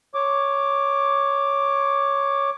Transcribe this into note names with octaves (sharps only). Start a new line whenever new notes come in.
C#5 D6